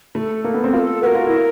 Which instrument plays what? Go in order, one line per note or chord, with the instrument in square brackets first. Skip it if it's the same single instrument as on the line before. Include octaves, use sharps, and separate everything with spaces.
[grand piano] A3 [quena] A4
[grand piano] A#3
B3
C4
[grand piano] F4 [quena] A#4
[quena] A4
[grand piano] F#4 [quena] A#4 B4
[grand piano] F4
E4